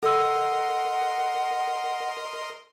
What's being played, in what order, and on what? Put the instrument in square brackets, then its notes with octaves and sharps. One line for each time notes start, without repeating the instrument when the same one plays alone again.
[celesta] A4 E6 [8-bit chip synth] A#4 D#5 C6 [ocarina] F#5